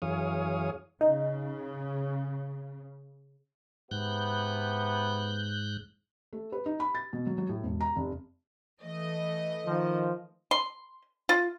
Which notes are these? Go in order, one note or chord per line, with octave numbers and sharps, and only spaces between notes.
F#2 E3 G#4 C#5 F5 D#6
C#3 D#4
G#2 C3 B3 F#6 G6
A3
B4
D#4
B5
A6
B2
F#3
F#3
A2
E1
A#5
F1
E3 A3 D#5
D#3 F3
C6
F4